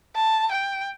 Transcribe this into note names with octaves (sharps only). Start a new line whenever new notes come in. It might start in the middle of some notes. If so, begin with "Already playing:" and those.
A5
G5